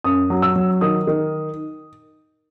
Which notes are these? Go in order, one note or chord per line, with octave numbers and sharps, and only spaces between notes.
F#2 D#6
F#3
E6
F#3
D#3 D#6
D#3